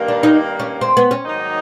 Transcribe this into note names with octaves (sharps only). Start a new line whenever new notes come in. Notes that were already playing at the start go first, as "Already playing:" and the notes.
Already playing: G2 D#3 G3 A#3
D4
D#4
C#4
C4
B3
C#4
G#2 D#3 F#3 A#3 D#4